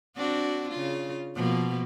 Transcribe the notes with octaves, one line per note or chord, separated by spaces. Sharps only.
C4 D4 F#4
C#3 F4
B2 F3 A#3